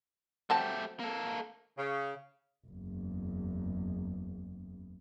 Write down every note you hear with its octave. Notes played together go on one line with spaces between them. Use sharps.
F#3 A3 C4 G4 A5
A#3 A4
C#3
F#1 E2